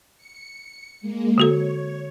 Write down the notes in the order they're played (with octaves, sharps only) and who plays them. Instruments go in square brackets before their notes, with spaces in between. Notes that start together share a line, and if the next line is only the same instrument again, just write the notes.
[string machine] C#7
G#3 A#3
[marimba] D3 F#4 A4 [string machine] C#5